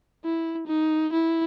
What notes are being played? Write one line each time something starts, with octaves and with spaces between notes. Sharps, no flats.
E4
D#4
E4